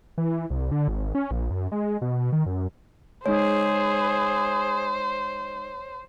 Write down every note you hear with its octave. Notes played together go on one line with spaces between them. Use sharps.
E3
C2
D3
G#1
C#4
A#1
F#2
G#3
B2
D#3
F#2
G#3 D#4 G#4 C5 C#5